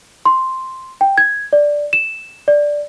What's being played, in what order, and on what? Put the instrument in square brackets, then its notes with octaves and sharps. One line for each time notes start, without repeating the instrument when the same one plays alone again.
[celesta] C6
G5
G#6
D5
E7
D5